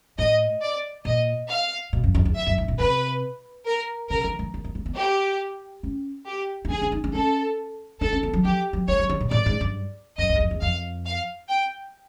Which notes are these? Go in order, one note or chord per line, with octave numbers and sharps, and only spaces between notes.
A2 D#5
D5
A#2 D#5
F5
B2
F#2
F2
E2
F2 E5
F#2
G#2
A#2
C3 B4
A#4
C#3 A#4
D#3
E3
A#3
A#3
A#3
B3
G4
C#4
G4
D#4
D4 G#4
D4
D#4
D4
C#4 A4
D4 A4
C#4
B3
F#3
F3 G4
F#3
G3 C#5
G3
D3
A#2
A2 D5
G#2
G2
F#2 D#5
F#2
E2
F2
E2
F2 F5
F5
G5